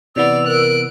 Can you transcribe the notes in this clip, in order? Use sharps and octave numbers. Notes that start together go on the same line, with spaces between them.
C3 E3 B3 D5 E6 F7
A#4 F#6 D7